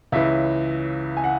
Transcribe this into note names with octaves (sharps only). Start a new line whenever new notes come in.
C#2 C#3 E3 E5
G#5
F#5